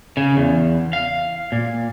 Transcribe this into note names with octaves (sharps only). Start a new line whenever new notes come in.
C#3
E2
F5
A#2